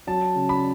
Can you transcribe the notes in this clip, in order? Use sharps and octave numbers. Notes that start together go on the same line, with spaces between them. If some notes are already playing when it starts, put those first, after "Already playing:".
F#3 A5
C#3
B5